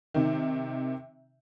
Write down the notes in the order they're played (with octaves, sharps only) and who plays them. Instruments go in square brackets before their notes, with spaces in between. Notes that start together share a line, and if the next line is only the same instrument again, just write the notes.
[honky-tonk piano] C3 D#3